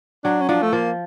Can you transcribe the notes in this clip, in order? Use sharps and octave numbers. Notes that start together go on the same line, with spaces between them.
F#3 D4
C#4
F3 D4
A3
F3 A#3